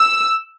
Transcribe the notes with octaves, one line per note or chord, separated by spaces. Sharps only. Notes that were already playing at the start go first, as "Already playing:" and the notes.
Already playing: E6